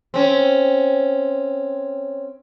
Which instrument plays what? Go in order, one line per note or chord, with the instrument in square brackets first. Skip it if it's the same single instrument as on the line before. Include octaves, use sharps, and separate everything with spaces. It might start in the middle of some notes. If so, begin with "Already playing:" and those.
[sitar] C4 C#4